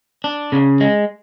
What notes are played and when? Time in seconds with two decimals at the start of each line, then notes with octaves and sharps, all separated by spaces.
0.24 D4
0.52 C#3
0.81 G#3